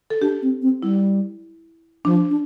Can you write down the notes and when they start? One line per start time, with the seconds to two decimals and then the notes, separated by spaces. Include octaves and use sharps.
0.10 A4
0.21 D4 G4
0.42 C4
0.62 C4
0.83 G3 E4
2.05 F3 D4
2.30 D4